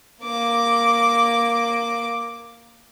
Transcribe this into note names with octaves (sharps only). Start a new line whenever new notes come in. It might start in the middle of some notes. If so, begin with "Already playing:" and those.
A#3 D6